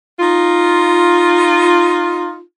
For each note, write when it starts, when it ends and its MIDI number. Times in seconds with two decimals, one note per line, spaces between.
0.18 2.38 63
0.18 2.38 65